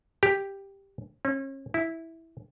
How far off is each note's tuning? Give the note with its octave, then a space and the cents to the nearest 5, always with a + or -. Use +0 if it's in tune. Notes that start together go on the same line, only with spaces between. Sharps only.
G4 +5
C#4 -35
E4 -10